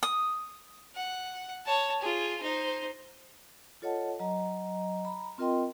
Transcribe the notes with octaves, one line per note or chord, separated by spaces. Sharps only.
D#6
F#5
C#5 A5
F4 G#4
D#4 C5
F4 A4 C#5 D#5 F#5 A5
F#3 D#5 A#5
A#5 B5
C4 F4 A#4 D#5 G5 C6